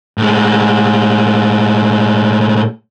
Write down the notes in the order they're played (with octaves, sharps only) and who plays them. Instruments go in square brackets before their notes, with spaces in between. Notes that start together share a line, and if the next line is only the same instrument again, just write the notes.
[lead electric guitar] A2 G#3